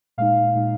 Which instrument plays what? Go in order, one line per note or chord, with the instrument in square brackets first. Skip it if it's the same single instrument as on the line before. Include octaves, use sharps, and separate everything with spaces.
[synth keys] A#2 G#3 D#4 F5
A#2 G#3 D#4